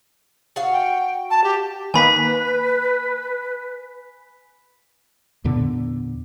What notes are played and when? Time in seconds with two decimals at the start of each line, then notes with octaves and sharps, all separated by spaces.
0.56 F#4 F5
0.72 G5
1.30 A5
1.44 G4
1.94 D#3 A#3 B4 G#5 B5 B6
5.44 E2 A#2 D3 B3